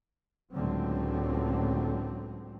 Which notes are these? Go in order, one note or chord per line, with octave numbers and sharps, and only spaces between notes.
C#2 A2 D3 F#3 C4